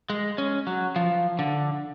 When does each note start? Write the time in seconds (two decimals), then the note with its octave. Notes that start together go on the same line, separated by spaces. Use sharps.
0.10 G#3
0.38 C#4
0.67 F#3
0.96 F3
1.39 D3